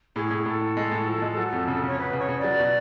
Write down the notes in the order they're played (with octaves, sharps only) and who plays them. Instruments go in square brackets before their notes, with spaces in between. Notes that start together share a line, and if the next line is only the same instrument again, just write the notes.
[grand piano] A2 [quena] G#4
[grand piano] A2
[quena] G#4
[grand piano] A2 [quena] A4
[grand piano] A2
G#3
A2
F3
G#3
F#3
F2
C#3
[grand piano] C#3 [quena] C#5
[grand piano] B3 [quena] B4
[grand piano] C#3
[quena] C#5
[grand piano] C#3
[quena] D5
[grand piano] F#3
B2